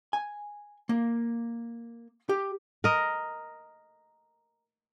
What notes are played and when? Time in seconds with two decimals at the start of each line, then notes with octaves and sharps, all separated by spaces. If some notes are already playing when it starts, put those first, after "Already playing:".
0.13 G#5
0.89 A#3
2.29 G4
2.84 A#4 D#5